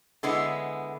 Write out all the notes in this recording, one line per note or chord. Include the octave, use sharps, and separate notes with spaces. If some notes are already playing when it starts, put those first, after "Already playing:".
D3 G#3 B3 E4